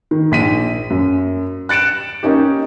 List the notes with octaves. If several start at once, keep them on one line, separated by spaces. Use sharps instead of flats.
D#3
A#1 B6 D#7
F#2
F#6 A6 C#7 D7 E7
A#3 C#4 D#4 G4